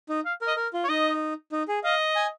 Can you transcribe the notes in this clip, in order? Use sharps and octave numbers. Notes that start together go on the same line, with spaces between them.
D#4
F5
A#4
D#5
A#4
F4
C#5
D#4 D#5
D#4
G#4
D#5 F5
G#5